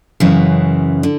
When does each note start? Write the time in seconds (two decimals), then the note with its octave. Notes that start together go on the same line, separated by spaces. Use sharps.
0.20 F#2 C#3 E3 G#3
1.03 D3